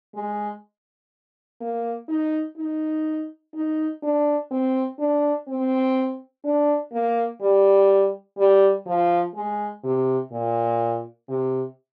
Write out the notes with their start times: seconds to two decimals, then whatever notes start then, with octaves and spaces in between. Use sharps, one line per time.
0.15 G#3
1.61 A#3
2.09 D#4
2.57 D#4
3.54 D#4
4.03 D4
4.51 C4
4.99 D4
5.48 C4
6.44 D4
6.92 A#3
7.41 G3
8.38 G3
8.86 F3
9.34 G#3
9.84 C3
10.32 A#2
11.29 C3